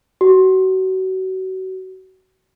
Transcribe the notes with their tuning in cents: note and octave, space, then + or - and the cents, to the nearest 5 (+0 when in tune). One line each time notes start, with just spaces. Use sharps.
F#4 +30